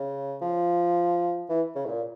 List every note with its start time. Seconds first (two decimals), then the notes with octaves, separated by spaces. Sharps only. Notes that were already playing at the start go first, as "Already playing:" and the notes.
Already playing: C#3
0.42 F3
1.49 E3
1.76 C#3
1.85 A2
1.89 A#2